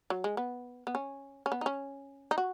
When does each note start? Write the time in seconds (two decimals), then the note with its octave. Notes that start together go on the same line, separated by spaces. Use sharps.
0.10 F#3
0.24 G#3
0.37 B3
0.87 B3
0.95 C#4
1.46 C#4
1.52 B3
1.61 D#4
1.66 C#4
2.31 D#4
2.38 F#4